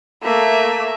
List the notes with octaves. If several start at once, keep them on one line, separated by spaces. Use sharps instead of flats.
A3 A#3 E5